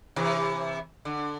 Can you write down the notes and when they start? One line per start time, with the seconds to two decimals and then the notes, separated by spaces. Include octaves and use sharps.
0.16 C3 E3
1.05 D3